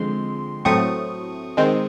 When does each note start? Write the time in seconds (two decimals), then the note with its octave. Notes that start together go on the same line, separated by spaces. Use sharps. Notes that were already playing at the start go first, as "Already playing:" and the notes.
Already playing: D3 F3 G#3 C4 C6
0.65 A2 F#3 A3 C4 C#6 D#6
1.57 D#3 G#3 C4